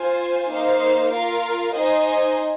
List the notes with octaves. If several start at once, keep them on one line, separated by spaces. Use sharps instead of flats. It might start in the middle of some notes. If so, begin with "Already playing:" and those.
Already playing: F4 C5 G#5
A#3 D#4 C5 F5
F4 A#4 F5
D#4 C5 D#5 G#5